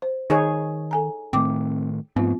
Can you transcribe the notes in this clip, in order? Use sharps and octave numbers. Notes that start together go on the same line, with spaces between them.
C5
D#3 D#4 G#4 C#5
A4 G#5 A#5
A2 D#3 A3 C4 G5 D6
G#2 F3 A3 B3 C4 F4